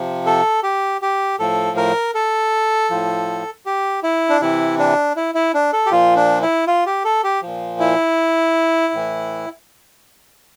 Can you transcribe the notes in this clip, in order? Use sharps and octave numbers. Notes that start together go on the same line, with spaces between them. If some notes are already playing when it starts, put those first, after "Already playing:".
Already playing: C3 F3
A4
G4
G4
A2 F3 A4
A#4
A4
A2 F3
G4
E4
D4
C3 E3 E4
D4
E4
E4
D4
A4
G4
A#2 F3 F4
D4
E4
F4
G4
A4
G4
A#2 F3
E4
A2 E3